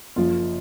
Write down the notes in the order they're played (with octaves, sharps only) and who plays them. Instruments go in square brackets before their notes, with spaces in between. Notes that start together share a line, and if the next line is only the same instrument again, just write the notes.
[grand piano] F#1 F#2 F3 F4